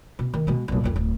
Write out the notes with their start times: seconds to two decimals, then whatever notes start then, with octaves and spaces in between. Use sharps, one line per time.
0.19 B2
0.34 D#3
0.47 B2 G#3
0.68 B1 A#2
0.84 A#1 F2
0.96 D1